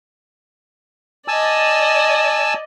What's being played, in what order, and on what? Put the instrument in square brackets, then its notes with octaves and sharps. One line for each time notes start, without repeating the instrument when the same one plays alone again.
[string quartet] D5 D#5 [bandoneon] G#5 A5 E6